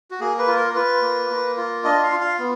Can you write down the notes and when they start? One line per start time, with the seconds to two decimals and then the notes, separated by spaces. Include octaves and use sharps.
0.11 F#4
0.20 A#3 G#4
0.39 B4
0.47 F4
0.57 A#4
0.75 F4 B4
1.02 A#3
1.30 A#3
1.57 F4
1.84 D4 D#5
2.03 F5
2.12 F4
2.21 F5
2.39 B3